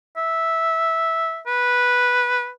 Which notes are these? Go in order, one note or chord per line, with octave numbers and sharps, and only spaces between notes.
E5
B4